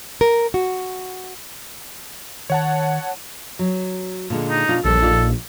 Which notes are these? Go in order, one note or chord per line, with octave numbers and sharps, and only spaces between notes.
A#4
F#4
D#3 C#5 F#5 A5
F#3
A#2 D3 G#3
D#4
B2 D4 F4
A#1 D#2 G3 A4
D#4 F4 D5